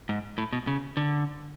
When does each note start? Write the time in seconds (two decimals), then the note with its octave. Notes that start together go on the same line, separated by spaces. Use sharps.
0.09 G#2
0.38 A2
0.53 B2
0.67 C#3
0.97 D3